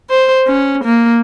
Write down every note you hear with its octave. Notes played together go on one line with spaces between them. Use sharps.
C5
C#4
A#3